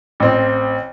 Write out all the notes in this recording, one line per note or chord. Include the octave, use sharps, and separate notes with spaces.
A1 C4